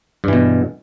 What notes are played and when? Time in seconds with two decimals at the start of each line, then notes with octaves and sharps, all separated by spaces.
0.24 G2
0.28 E3
0.33 B2